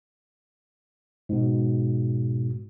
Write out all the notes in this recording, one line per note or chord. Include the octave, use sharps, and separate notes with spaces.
G#2 B2